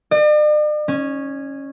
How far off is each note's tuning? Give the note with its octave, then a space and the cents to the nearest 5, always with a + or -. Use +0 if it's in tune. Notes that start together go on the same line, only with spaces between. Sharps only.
D5 +45
C#4 -10